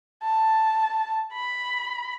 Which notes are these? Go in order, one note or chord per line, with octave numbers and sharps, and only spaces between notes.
A5
B5